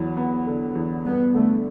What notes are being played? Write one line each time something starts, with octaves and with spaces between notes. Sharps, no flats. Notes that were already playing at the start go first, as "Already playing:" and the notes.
Already playing: E2 F#3 B3
B3
D3
E2
G2 B3
D3 A3